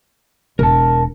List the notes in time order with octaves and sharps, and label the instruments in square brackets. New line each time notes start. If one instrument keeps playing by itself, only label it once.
[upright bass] E1 [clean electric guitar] A#4 A5